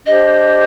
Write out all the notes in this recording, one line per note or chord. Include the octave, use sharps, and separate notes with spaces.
D4 G4 C5 D#5